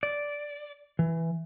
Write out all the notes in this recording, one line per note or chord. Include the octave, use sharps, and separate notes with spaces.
D5
E3